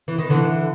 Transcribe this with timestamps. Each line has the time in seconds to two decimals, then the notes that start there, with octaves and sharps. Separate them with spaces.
0.08 E3
0.18 D#3
0.30 D3 E3